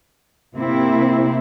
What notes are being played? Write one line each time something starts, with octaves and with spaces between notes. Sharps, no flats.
C3 A#3 C4 E4